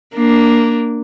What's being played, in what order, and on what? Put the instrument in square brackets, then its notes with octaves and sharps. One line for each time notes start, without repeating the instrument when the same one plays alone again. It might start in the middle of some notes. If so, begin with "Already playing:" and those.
[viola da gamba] A#3 D4